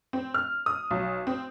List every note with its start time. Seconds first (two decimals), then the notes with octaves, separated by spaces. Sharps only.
0.13 C4
0.34 F6
0.66 D#6
0.91 B1
1.27 C4